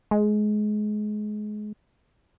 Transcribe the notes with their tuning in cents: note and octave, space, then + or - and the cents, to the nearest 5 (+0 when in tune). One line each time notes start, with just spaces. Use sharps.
G#3 +25